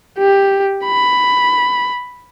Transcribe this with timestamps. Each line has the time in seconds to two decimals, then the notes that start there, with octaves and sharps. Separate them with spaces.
0.18 G4
0.84 B5